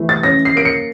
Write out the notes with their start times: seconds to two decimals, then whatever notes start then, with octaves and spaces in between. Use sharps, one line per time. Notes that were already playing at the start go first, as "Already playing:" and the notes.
Already playing: E3 A3
0.09 A6
0.23 C#4 A#6
0.45 C7
0.55 A#3 D7
0.65 C#7